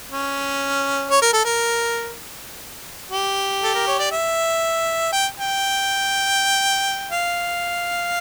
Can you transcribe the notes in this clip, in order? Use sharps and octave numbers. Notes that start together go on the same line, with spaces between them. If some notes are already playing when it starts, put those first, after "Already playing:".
C#4
C#5
A#4
A4
A#4
G4
A4
A#4
C#5
D5
E5
G5
G5
F5